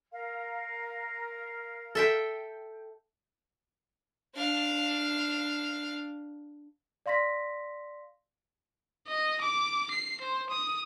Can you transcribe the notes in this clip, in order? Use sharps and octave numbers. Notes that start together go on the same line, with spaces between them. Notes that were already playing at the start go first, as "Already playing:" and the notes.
A#4 F5
A4 E5 G5
D4 F5
D5 F5 C6 A#6 B6
D#5
D6
C7
C5
D#6